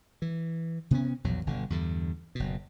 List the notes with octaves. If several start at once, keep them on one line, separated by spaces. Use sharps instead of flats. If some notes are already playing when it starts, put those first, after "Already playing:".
E3
C3 B3 C#4
A#1 E2 B2 F#3
G1 B2 D3
E2 G2 D3
F#1 B2